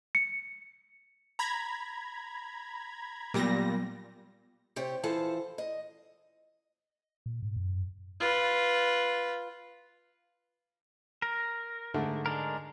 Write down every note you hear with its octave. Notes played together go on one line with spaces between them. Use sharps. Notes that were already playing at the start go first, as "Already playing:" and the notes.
C#7
A#5 B5 G#6
A#2 F#3 G3 B3 A#6
C3 C4 G4 C#5
E3 F3 A4 C5 F5 A5
D#5
A#2
G#2
F#2
F4 B4
A#4
G#2 D3 A3
G#3 D4 A#4